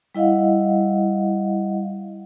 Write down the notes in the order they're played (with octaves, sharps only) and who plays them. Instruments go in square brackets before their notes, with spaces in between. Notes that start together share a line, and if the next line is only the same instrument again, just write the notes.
[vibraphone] G3 E4 D#5 F5 F#5